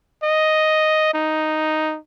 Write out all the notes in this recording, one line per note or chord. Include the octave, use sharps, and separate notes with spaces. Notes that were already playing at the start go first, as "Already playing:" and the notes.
D#5
D#4